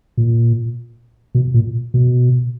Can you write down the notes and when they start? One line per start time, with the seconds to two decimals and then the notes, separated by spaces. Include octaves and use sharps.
0.17 A#2
1.35 B2
1.54 A#2
1.94 B2